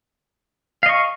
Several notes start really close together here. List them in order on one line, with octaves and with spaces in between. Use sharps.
F5 D#5 C#6